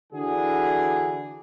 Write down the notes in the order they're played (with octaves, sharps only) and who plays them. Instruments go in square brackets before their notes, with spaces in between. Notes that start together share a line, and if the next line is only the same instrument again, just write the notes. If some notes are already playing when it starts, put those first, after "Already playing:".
[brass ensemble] D3 E3 D4 F#4 G#4